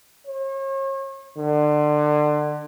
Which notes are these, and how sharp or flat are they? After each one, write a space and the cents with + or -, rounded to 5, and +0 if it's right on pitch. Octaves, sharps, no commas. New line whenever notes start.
C#5 -40
D3 +30